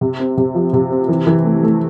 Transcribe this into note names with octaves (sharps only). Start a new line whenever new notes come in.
C3
C4
C3
F3
C3
C4
E3
E3
A3
A3